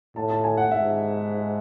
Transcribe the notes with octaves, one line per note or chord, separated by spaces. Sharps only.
A2 A5
A5
G#5
F#5
G#2 E5